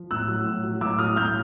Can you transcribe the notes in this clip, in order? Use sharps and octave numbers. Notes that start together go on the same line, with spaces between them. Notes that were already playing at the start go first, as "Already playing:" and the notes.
Already playing: F3
A2 E6 F#6
F#3
A2
F#3
A2 D6 E6
F#3 D#6 F6
A2 F6 G6